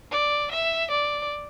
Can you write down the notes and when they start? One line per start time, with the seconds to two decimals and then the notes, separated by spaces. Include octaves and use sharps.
0.11 D5
0.51 E5
0.91 D5